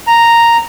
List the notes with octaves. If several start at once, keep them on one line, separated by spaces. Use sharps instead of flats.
A#5